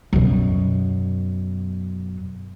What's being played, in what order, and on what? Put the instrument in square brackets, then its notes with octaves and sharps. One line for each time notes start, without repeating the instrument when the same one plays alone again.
[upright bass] F#2 B2